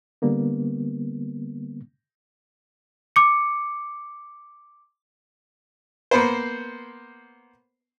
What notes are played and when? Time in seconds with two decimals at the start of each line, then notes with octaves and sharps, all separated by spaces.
0.22 D3 G3 A#3 B3
3.16 D6 C#7
6.11 A#3 B3 C5